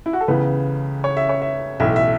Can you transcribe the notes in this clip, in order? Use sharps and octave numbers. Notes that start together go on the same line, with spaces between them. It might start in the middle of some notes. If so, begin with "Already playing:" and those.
E4
F#4
A4
C#2 C#3 E3 B3 B4
C#5
E5
C#5
E5
B1 A2 E3 E5
E5